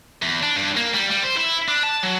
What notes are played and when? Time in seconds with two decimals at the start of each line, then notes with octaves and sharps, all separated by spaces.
0.22 E2
0.43 D4
0.56 G2
0.76 A#3
0.94 G3
1.10 G3
1.23 C5
1.36 E4
1.68 D4
1.83 A5
2.03 F#3